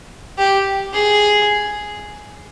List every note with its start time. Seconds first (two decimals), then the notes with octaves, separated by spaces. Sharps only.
0.38 G4
0.94 G#4